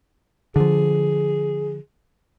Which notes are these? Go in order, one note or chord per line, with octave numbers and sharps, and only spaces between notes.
D3 F3 G#4